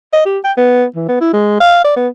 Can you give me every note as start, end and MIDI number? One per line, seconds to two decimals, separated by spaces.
0.13 0.25 75
0.26 0.39 67
0.44 0.52 79
0.57 0.85 59
0.95 1.06 52
1.09 1.18 59
1.21 1.32 64
1.33 1.58 56
1.60 1.81 77
1.84 1.94 74
1.96 2.08 59